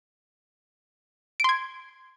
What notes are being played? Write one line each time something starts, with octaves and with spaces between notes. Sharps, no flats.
C6 G#6 D7